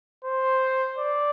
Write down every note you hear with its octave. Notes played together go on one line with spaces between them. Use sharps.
C5
D5